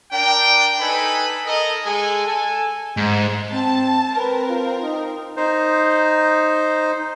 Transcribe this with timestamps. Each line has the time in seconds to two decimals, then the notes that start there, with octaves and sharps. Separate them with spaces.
0.12 D4 A#4 G5
0.80 D#4 A4 B4 G#5 B5
1.45 A4 A#4 D#5
1.85 G#3 G#4 A4 G#5
2.26 A4 G#5
2.97 G#2
3.51 C4 A5
4.16 C4 A#4 B4
4.49 F4
4.82 D#4
5.37 D#4 C5